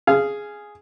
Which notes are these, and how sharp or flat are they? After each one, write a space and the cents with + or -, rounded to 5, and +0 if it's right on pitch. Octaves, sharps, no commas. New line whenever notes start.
G#4 +0 F5 -15